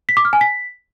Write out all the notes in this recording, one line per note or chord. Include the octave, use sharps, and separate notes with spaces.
B6
D6
F6
G#5
B6